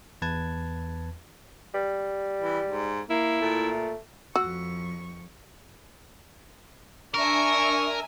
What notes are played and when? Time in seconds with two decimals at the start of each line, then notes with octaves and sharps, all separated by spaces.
0.22 E2 B4 A5 G#6
1.74 G3
2.42 E3
2.65 G#2
3.10 A#3 E4
3.42 A#2 A3
4.36 F2 F#4 C#6 E6
7.14 D4 A#4 E5 G#5 C#6